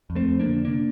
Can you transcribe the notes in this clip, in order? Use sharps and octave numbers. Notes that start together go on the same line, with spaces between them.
F2
A3 C4
F2
A#3 D4
D3
C3 A#3 D4